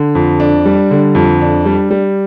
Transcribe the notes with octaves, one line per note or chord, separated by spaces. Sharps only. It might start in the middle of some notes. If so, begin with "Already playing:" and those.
Already playing: D3
F2
D4
G3
D3
F2
D4
G3
G3